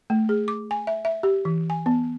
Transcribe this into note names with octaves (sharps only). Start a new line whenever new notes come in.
A3
G#4
D6
G#5
E5
E5
G4
E3
G#5
B3